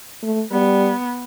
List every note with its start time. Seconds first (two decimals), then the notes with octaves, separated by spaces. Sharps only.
0.23 A3
0.52 G3 B3